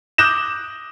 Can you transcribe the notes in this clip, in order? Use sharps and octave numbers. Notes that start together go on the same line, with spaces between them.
D6 D#6 F#6 G6 A#6 E7